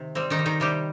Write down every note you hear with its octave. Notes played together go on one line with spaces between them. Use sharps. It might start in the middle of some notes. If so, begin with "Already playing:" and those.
Already playing: C3 D#3
G3 C4
D#3 D#4
G3
D#3 D#4
C3 G3 G4